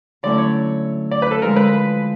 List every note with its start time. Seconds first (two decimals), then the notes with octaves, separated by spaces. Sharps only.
0.23 D3 F#3 A3 C#4 E4 D5
0.38 C#5
1.11 D5
1.22 B4
1.31 A4
1.42 D3 F3 G#3 A#4
1.56 B4